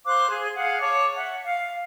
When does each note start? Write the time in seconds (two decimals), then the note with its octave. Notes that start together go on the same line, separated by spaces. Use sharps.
0.06 C5 F5 D6 F#6
0.28 G#4
0.56 G#4 F5 F#5
0.80 C#5 A5 D6
1.15 E5 F#5
1.45 F5